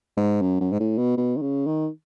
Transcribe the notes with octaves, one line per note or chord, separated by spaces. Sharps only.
G#2
F#2
F#2
G#2
A2
B2
B2
D#3
C#3
D#3